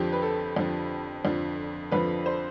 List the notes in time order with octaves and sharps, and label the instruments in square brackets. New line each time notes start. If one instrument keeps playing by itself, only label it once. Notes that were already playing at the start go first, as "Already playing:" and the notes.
Already playing: [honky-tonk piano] F2 D3 F3 G4
B4
A4
F2 D3 F3
F2 D3 F3
F2 D3 F3 B4
C5